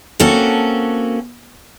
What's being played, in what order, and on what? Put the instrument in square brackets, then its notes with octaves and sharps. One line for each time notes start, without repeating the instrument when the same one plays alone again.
[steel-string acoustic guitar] A#3 C4 C#4 F#4 A4